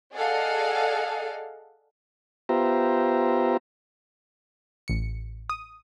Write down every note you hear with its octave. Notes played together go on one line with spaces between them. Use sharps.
G#4 A4 D5 D#5 F5 F#5
B3 F4 G4 C5 E5 A#5
A1 C#7
D#6